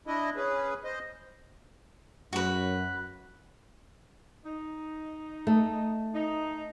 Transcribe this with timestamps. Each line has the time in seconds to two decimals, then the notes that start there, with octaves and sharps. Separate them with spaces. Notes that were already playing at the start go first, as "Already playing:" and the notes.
0.07 D4 E4 D#5
0.36 C#4 G#4 B4
0.84 C5 D#5
2.33 F#2 F#4 B4
4.45 D#4
5.47 A3
6.15 D#4